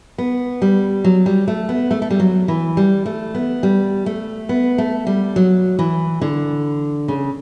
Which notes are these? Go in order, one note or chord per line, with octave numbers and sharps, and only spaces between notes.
B3
G3
F#3
G3
A3
B3
A3
A3
G3
F#3
E3
G3
A3
B3
G3
A3
B3
A3
G3
F#3
E3
D3
C#3